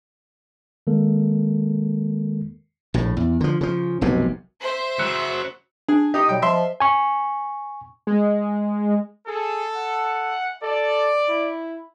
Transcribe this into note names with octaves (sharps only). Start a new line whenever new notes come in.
D#3 G#3 A#3 A4 A#4
A#1 A2
E2
D3 F3
C#3 F3
F1 B1 F#2 C3
C5 E5
C#3 F#3 E6 F#6 C#7
D4 G#4
D#4 G4 D#5 D#6
B2 F#3 G3 G5
F3 E5 C6
G#5 C#6
G#3
G#4 A4
F#5
A4 D5
E4